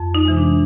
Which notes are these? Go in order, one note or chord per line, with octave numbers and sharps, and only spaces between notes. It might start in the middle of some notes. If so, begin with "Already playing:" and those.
Already playing: F2
D#4
C3 E3 G#3
D4